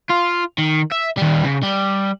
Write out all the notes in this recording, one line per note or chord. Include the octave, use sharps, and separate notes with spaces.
F4
D#3
E5
D#3 G3
C#3
G3